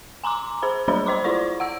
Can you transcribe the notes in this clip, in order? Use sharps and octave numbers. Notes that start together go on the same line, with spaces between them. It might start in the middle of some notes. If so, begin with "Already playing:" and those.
G#5 A#5 C6 D6
G#4 C5 B5
F#3 G3 D4 G#4 C#5 B5
C5 D#5 C6 D6
E4 F4 C5 D5 C#6
F#5 E6 D7